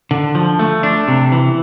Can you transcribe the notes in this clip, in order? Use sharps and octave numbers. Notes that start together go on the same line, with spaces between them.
D3
F3
A3
D4
C3
E3